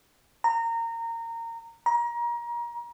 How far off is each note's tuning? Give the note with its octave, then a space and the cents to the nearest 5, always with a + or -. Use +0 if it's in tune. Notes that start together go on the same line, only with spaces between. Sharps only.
A#5 -20
A#5 +30